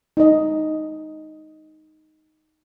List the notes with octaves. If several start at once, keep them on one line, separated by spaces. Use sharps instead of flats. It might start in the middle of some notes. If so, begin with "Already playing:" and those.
D#4 D#5